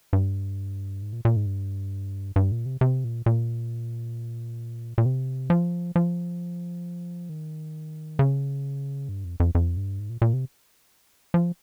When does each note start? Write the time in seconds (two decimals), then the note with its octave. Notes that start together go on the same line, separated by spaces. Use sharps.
0.13 G2
1.02 G#2
1.13 A#2
1.25 A#2
1.36 G#2
1.46 G2
2.36 G2
2.52 A#2
2.66 C3
2.81 C3
3.04 A#2
3.26 A#2
4.98 A#2
5.06 C3
5.50 F3
5.96 F3
7.29 D#3
8.19 C#3
9.09 G2
9.25 F2
9.40 F2
9.55 F2
9.77 G2
9.99 G#2
10.10 A#2
10.22 A#2
10.33 C3
11.34 F3